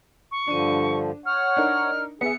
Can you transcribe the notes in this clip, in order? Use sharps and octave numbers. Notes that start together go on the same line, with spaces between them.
C#6
G2 D3 F3 D4 D#7
C#5 F#5 F6
D4 D#4 A#4
B3 G#4 E5 C#7